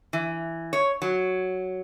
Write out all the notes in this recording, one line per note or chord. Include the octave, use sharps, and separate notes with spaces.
E3
C#5
F#3